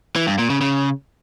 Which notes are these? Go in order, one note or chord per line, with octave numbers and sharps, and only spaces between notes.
E3
G2
A#2
C#3
C#3